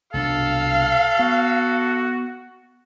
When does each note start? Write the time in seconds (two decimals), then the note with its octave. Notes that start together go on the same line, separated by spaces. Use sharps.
0.14 C2 B2 D4 A4 F5
1.19 B3 F#4